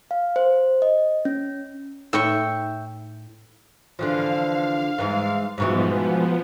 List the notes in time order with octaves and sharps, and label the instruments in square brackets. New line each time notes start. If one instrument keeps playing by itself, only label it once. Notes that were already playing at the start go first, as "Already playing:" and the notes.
[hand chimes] F5
C5
D#5
C#4
[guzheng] A2 [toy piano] D#4 [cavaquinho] E5 G5 C#6
[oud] D3 E3 F3 [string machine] F5
[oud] G#2 E3
[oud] G#2 B2 E3 [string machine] F3 B3